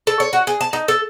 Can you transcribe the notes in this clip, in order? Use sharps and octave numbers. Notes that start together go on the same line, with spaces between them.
A4
C#5
F#4
G#4
A5
D#4
A4